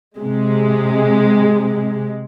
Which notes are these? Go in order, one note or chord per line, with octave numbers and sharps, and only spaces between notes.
C3 G#3